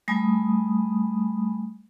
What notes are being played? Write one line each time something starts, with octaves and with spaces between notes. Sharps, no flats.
G3 A3 G#5 B5 D#6